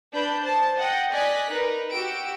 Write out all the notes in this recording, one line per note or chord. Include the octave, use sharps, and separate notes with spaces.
D4 B4 B5 G6
C5 A5
D#5 F#5 G5
D5 D#5 G#5 F#6 B6
D#4 A#4 B4
F#4 G4 E6 D7